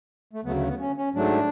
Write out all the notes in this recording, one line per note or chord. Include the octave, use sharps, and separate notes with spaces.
A3
D2 C#3 F#3 A3 B3
A3
B3
C#4
C#4
G#2 F#3 A3 D4